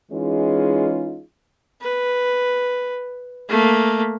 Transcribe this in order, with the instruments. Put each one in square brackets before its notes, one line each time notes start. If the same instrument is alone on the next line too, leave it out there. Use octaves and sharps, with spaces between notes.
[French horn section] E3 G#3 C#4 D#4 F4 G#4
[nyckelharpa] B4
A3 A#3